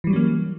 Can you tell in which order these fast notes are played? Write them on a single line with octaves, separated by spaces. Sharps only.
E3 G3 F#3 C#4 A#3